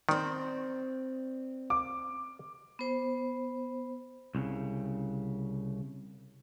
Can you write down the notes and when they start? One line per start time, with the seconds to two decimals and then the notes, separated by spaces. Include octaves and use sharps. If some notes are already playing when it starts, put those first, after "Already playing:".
0.09 D#3 C4 D5
1.70 D6
2.79 B3 C5
4.35 C2 A2 C#3